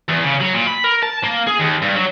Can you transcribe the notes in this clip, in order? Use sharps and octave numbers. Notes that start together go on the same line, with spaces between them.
E2
C#3
F#3
A#2
B5
A#4
A5
A#3
G#4
D#2
G2
F#3